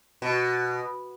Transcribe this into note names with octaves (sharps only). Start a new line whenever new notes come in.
B2